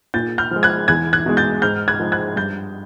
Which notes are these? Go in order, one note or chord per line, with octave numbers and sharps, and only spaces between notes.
A#2 G6 A6
F6 G6
F3 G#3
F#6 G#6
E2 F#6 G#6
F#6 G#6
B2 G#3
G6 A6
G#2 F6 G6
F#6 G#6
F3 G#3
F#6 G#6
G2 G6 A6